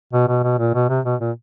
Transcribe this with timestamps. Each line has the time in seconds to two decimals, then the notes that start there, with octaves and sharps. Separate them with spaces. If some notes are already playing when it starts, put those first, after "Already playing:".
0.13 B2
0.28 B2
0.43 B2
0.59 A#2
0.74 B2
0.89 C3
1.05 B2
1.21 A#2